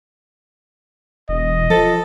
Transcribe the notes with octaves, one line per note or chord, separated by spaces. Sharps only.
E1 D#5
F3 A4